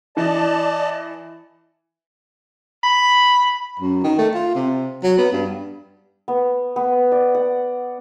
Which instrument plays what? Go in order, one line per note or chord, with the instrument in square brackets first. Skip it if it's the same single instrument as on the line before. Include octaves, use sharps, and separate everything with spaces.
[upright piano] E3 [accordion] D5 D#5 A5
[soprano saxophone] B5
[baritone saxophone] F#2
D#3
A3
F4
C3
F#3
B3
G2
[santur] B3
B3
D5
F#5